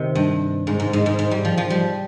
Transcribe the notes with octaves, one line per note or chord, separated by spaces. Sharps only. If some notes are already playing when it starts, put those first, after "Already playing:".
Already playing: C3 D#3
G2
G#2
G#2
G#2
G#2
G#2
G3
F3
F3
G3